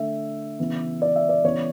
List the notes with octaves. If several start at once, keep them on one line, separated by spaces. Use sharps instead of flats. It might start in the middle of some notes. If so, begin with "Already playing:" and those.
Already playing: D3 A3 E5
C#3 E3 B3
D5
E5
D5
C#3 E3 B3 C#5